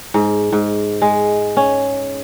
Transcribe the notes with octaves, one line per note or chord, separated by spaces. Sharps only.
G#2
G#2
G#3
C#4